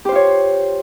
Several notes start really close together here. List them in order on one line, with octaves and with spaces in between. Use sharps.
G4 C5 F4 C#5